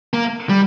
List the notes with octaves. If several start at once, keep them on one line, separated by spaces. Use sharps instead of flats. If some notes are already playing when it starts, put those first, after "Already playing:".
A#3
G3